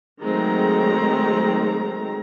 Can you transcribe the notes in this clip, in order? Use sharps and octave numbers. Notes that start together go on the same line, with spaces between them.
D#3 F#3 G#3 A3 C4 A#5